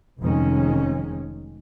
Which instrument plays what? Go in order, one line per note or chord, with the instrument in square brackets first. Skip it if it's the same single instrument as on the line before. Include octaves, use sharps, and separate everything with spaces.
[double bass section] F1 F2 D#3 G#3 C#4